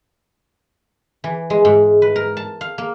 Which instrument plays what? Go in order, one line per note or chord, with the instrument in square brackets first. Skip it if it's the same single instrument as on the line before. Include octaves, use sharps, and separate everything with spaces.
[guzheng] E3
G#3
G#2
B4
A#4
A5
F5
A#3